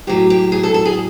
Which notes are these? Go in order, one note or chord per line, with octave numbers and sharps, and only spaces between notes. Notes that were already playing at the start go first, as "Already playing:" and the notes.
A2 F#3 G4
G4
G#4
A4
A4
G#4